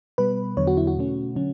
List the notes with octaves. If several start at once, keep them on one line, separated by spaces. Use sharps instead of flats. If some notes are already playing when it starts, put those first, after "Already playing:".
B2 G3 B3 B4
E2 D3 F#3 B3 C#5
F#4
E4
F#4
B2 A3 C#4
D3 F#3 C#4